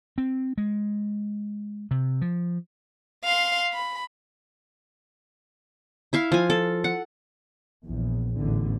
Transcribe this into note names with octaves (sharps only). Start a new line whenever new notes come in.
C4
G#3
C3
F3
F5 C6
B5
E4 E5 F5
F3 G#5
A4
F#5
A#1 E2
A1 E2 D3